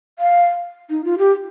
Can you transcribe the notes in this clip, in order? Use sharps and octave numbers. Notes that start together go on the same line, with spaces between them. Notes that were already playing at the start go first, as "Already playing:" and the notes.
F5
D#4
F4
G4